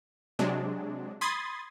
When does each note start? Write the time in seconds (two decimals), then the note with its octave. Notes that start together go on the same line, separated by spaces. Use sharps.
0.39 C3 F#3 G#3 D4
1.21 B5 C6 D#6 G#6 A6